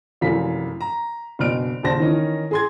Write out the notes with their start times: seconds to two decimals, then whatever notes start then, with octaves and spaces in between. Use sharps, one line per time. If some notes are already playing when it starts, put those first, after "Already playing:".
0.21 F1 F#2 E3 F5 B6
0.81 A#5
1.39 F#1 B2 D4 F6 D7
1.83 D#1 C#3 D4 C5 A5 A#6
2.00 D#3 E3 C#4 D#4
2.51 G#4 C6 G#6